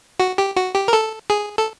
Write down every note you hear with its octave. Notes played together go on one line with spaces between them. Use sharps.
F#4
G4
F#4
G4
A#4
A4
G#4
A4